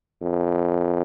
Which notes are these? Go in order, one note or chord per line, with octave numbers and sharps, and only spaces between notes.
F2